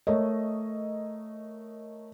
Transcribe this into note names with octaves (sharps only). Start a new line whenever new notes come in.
A3 A#4 C#5 D#5